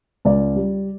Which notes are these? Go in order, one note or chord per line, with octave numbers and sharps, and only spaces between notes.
C#2 D5
G3